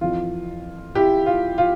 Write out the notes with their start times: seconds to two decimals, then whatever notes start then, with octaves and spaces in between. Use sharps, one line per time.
0.01 F2 E3 F4
0.95 E4 G4
1.26 F4
1.58 F4